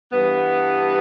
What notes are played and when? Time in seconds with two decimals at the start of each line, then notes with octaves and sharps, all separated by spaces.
0.12 G2 E3 G3 B3